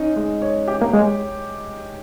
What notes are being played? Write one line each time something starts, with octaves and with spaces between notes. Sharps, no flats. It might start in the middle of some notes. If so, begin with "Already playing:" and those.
Already playing: C#4 D#4
G#3
C#5
G4
A#3
G#3 C#5